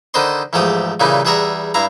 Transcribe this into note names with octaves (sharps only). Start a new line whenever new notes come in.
D3 D#3 B4 C5 D#5 C6
E2 G#2 F3 A3 G4 D#6
A#2 C#3 E3 G3 A#3 D#4
E2 G3 G#4 E5 F#5 A#5
G2 E4 F5 A#5